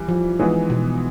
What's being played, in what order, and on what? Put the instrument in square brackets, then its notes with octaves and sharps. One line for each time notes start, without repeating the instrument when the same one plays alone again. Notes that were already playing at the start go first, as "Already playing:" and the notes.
Already playing: [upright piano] E3 G3
[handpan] F3
[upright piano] E3 G#3 B3 D#4
[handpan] B2